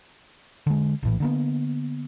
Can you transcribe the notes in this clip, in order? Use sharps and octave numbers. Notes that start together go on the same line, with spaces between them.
D3 G#3
A#1 A2 E3
D3 A#3 B3